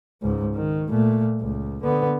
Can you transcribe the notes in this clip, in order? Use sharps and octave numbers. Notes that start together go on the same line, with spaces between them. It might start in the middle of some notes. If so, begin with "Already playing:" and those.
C#2 G#2
D#3
A#2 A3
C#2
D3 B3